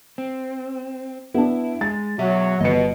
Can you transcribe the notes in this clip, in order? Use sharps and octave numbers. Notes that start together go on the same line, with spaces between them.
C4
B3 D4 E4
G#3 A6
B2 F#3 E5
G1 B2 B4 D#5 C#7